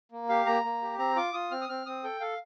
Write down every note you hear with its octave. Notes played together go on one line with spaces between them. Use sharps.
A#3
G4 F5
A#3 A#5
A#3
G4
C4 A#5
F4 D6
F4 D#6
C4 F6
D#6
C4 F6
C4 D#6
A4 G5
A4 F5